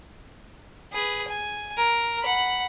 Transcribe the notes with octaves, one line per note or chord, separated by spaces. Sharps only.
G#4 B4
G#5
A#4
F#5 B5